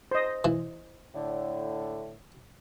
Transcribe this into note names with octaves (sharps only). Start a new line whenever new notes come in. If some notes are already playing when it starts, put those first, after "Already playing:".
C5 D#5
E3
A2 D3